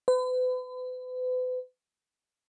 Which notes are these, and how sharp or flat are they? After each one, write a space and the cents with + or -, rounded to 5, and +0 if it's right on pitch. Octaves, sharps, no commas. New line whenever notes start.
B4 +40